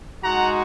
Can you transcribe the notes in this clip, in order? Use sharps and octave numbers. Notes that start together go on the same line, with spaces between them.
G#3 D#4 F#4 F#5 A#5